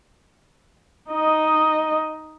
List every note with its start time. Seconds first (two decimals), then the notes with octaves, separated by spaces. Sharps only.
1.11 D#4 D#5